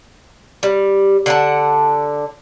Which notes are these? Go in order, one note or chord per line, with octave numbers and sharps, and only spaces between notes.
G3
D3 F#5 A5